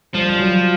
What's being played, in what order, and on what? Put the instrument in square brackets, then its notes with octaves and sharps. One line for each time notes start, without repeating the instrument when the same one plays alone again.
[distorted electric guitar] F3 [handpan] G3
[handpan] G3
F#3